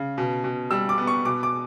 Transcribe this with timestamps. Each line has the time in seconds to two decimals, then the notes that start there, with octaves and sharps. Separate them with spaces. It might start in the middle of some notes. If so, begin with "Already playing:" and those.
Already playing: C#3
0.18 B2
0.44 B2
0.71 G3 E6
0.89 D6
0.98 B3
1.07 C#6
1.25 B2 D6
1.43 D6